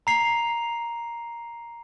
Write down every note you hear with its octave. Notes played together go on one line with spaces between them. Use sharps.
A#5 C7 F7